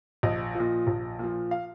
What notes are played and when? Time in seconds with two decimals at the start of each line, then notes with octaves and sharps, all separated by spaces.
0.23 A#1 D#5
0.55 F3
0.60 A#2
0.87 A#1
1.19 A#2 F3
1.51 F5